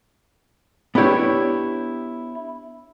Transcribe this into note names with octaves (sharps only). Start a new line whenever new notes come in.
B3 D4 E4 G4 C#5